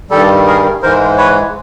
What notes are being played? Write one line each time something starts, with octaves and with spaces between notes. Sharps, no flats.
G2 D#3 G3 G4 A4
G#4 A#4
G#2 E3 G#3 A#4 C5
B4 C#5